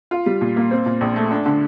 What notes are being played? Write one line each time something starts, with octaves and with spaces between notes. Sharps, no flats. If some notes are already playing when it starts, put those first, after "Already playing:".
F4
G3
A#2
A#3
C4
A#2
A#1
A3
D4
D3